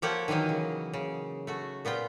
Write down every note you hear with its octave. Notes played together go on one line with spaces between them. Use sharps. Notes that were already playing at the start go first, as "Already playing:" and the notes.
F3 A#3 G4 A4 C#5 F#5
D#3 E3 F#3 A#3 D#4
C#3
C#3
A3 F#4
A#2 B3 F4 G5